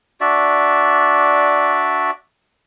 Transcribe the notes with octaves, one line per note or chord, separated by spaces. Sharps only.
D4 F#4 D5 E5